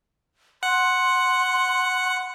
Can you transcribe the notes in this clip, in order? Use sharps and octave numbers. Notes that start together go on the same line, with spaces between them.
F#5 C6